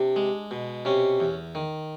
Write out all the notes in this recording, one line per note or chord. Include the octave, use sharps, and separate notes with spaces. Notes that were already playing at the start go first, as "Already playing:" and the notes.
Already playing: C3 D4
G#3
B2
C3 C#4
E2
D#3